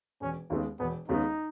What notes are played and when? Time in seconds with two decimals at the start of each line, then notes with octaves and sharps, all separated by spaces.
0.21 E1 C#4
0.50 D#2 C#3 G#3 A3 B3
0.79 E1 B3
1.08 D#2 C#3 G#3 B3 D#4